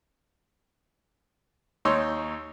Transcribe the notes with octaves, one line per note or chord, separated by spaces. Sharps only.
D#2 D#4 C#5 C6 E6